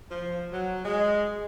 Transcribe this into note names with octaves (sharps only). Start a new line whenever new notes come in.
F3
F#3
G#3